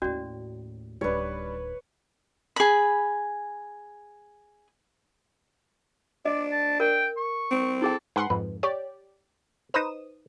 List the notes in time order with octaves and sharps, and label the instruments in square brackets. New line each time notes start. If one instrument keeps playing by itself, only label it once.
[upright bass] D#2 A2 [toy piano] C#4 F#4 D5
[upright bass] D1 D#3 [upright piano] G3 D4 [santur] B4 C#5
[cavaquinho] G#4 B5
[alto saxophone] D4 [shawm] D5 [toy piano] D#5
[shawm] A5
[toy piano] A#4 [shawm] G5
[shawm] C#6
[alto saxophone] C4
[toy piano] E4 G#4 G5 [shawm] A4
[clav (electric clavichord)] G#2 [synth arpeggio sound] B4 F#5 C6
[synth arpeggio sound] F2 G#2 [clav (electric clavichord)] B4
[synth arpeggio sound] G4 D5 [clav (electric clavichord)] C#5
[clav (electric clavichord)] D#4 B4 C5 [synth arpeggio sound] D#6 E7